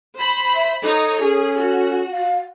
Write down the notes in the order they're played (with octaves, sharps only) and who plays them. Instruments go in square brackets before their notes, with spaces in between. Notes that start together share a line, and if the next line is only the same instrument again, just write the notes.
[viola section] C5 B5
[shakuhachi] E5
[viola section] D#4 C#5 [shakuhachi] A4
[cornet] C#4 [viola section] G#4
[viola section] F#4
[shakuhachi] F5